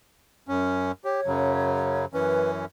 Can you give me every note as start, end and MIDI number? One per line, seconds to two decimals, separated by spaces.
0.48 0.92 42
0.48 0.92 61
1.05 1.21 67
1.05 2.06 73
1.26 2.05 42
1.26 2.05 49
1.26 2.05 54
2.14 2.65 42
2.14 2.65 52
2.14 2.65 61
2.14 2.50 71